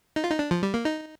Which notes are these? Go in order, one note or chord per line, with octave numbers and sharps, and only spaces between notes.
D#4
F4
D#4
D4
F3
G3
A#3
D#4